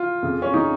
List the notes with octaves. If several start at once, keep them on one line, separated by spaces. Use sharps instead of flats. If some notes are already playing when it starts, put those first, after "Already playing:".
Already playing: F4
F2 C#3
C#4
C#3 D#4